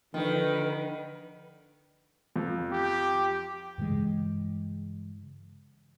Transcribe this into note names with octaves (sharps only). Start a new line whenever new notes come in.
D3 D#3 F3 D#4 B4
F2
G4
G2 C#3 E3 G#3